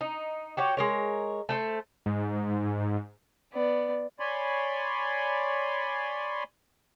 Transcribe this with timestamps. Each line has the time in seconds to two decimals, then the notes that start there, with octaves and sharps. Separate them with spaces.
0.01 D#4
0.57 F#4 G4 C#5
0.77 G#3 A#4 C#5
1.49 A3 A4 C5
2.06 G#2
3.54 B3 D5
4.20 C#5 D5 G#5 B5 C6